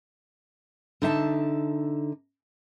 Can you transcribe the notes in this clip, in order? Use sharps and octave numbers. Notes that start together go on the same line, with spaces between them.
D3 D#4 E5 A5